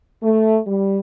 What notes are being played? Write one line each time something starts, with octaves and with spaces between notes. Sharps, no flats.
A3
G3